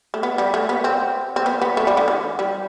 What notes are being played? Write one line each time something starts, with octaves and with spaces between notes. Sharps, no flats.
A3
B3
G3
A3
B3
C4
C4
B3
B3
A3
G3
D3
E3
G3